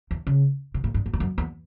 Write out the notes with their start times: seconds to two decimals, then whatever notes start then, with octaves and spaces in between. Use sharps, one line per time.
0.11 E2
0.27 C#3
0.74 B2
0.84 A2
0.94 G2
1.06 F#2
1.13 E2
1.20 F#2
1.38 E2